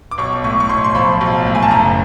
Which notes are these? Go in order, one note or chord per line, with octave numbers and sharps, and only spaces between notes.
D6
B1 C#6
A2 C#6
C#6
B1 C6
C6
F3 B5
B1
A2
G#5
A5
F#1 A#5